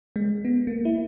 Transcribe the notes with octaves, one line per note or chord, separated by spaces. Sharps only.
G#3
B3
A#3
E4